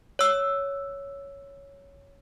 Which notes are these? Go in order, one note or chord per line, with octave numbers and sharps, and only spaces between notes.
C#5 E6